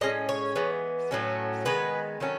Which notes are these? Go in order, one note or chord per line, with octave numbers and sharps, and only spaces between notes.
A2 G#3 C#4 D#5
C#5
E3 G#3 B3
A2 F#3 A3 C#4
D#3 G#3 B3 B4
D#3 F#3 A3 C#4